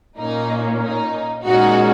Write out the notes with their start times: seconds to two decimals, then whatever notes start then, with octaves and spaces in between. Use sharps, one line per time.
0.18 A#2 A#3 C#4 D#4
0.81 D#4
1.45 A#2 G#3 C#4 D#4 F#4